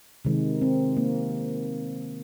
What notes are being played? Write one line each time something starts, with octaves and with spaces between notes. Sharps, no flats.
C3 D#3 G#3
C4
A#3